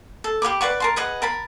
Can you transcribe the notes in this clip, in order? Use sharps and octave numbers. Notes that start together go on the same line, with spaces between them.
A4
G4 F5 B5 D6
B4 D5 F#5 C#6
A#4 A5 C6
G#4 B4 D#5 F#5
A#4 A5 B5